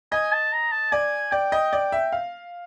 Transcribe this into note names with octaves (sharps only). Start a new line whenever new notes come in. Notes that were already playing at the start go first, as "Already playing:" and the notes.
D#5 G#5
A5
A#5
A5
D5 G#5
D5 G5
D#5
D5
E5
F5